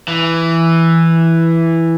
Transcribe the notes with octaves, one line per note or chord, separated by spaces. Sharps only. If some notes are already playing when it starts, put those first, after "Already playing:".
E3